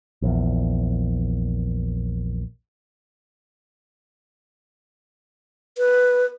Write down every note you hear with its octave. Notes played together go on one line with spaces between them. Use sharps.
A#1 E2
B4